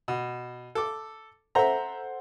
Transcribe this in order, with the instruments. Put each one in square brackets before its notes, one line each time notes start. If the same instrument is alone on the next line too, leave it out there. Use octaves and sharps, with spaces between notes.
[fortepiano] B2
A4 D6
[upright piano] A4 C5 F#5 [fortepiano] E5 A#5